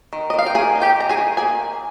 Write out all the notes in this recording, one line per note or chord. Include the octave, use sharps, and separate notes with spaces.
D#3
D#5
D#3 F5
G5
A#3 G#4 G#5
D#4
G4 G5
D#3 A#5
G#4 G#5
D#3
A#3 G#4 G#5